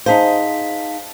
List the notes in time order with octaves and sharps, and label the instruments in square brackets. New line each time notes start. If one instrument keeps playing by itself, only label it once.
[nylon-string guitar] D#4 G#4 C5 [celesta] F5 A5 B6